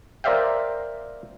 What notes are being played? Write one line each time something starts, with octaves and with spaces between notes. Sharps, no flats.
A#4 C5 D5 E5 F5 G5